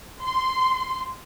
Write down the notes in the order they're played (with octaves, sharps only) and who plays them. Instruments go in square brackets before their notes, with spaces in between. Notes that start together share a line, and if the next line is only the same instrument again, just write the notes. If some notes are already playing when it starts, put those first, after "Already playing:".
[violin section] C6